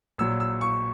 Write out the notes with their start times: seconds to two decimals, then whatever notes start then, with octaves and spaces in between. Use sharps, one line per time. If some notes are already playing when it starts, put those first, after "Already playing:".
0.18 A#1 A#2 F#3 E6
0.40 E6
0.61 C#6